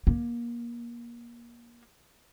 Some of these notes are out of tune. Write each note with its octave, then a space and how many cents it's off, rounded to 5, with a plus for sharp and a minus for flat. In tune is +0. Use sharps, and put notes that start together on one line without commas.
A#3 +25